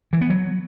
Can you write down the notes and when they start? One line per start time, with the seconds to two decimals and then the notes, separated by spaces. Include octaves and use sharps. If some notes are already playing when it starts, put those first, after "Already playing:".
0.13 E3
0.21 B3
0.30 F#3